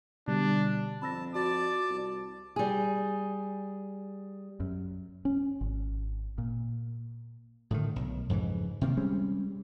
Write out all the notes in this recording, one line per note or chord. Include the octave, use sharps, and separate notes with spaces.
B2 D3 G3 D4
F2 A5 B5 E6 A#6
F#4 D5 A5 D6
C2
G3 G#4
F#2
C#4
G#1
A#2
A2 D3 D#3
B1
F2 G#2 C#3 E3
C3 D#3 A#3
G3 G#3 C4 C#4